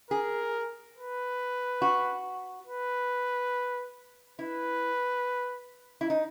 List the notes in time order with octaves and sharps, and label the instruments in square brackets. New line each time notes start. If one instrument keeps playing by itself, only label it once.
[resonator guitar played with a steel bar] G#4 [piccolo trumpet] A#4
[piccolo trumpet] B4
[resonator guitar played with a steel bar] F#4
[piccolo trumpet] B4
[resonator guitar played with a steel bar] E4 [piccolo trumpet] B4
[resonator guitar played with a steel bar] E4
D#4